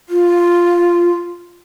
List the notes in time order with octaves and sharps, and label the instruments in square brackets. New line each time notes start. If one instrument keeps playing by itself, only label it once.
[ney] F4